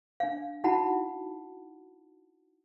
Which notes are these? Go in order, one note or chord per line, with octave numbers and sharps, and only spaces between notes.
D4 F5
D#4 E4 F#4 F#5 A5 B5